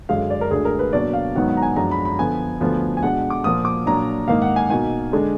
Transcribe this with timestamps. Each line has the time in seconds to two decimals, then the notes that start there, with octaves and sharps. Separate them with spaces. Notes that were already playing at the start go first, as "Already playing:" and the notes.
0.09 F#2 D3 G#3 F5
0.30 D5
0.41 A#4
0.51 D2 D3 G#3 D4 G#4
0.65 A#4
0.79 B4
0.93 B2 F#3 A#3 D4 D5
1.13 F5
1.35 G#2 D#3 F#3 B3 D#4 F#5
1.48 F#5
1.57 A#5
1.62 G#5
1.76 F#2 F3 G#3 D4 A#5
1.91 B5
2.05 B5
2.19 D3 F3 B3 G#5
2.60 D2 D3 F3 B3 D4
2.97 G#5
3.03 B2 G#3 D4 F#5
3.30 D6
3.44 A#2 F3 A#3 D#6
3.65 D6
3.86 A#2 F#3 D4 A#5
4.28 G#2 D#3 A#3 D#4 F5
4.42 F#5
4.56 G#5
4.70 B2 A#3 D#4 G#5
5.12 D3 G#3 D4